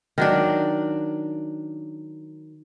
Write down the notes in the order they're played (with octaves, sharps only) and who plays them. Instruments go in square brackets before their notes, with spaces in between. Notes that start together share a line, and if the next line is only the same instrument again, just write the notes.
[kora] D#3 F#3 D4